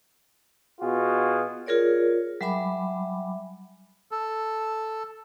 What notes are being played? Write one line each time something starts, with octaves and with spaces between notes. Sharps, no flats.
B2 F4 F#4 G#4
F4 G#4 A#4 C#5 D5
F#3 G3 E5 G#5 B5 D6
A4